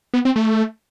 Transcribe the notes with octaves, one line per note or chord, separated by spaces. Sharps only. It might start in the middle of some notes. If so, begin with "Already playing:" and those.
B3
C4
A3